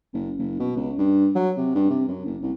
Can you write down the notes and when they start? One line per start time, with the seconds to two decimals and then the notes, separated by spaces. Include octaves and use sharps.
0.13 F#1
0.38 F#1
0.60 B2
0.76 C#2
0.98 G2
1.35 F#3
1.57 C3
1.75 G2
1.90 C3
2.08 F#2
2.25 F#1
2.43 C2